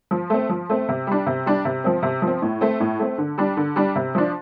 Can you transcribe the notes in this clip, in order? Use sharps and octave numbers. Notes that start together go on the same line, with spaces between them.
F3
A3 C4
F3
A3 C4
C3
G3 D4
C3
G3 D4
C3
F3 C4
C3
F3
C4
A2
A3 C4
A2
A3 C4
D3
G3 D4
D3
G3 D4
C3
F3 D4